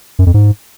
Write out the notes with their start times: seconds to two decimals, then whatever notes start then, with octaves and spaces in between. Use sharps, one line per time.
0.19 F#2
0.26 F2
0.34 G#2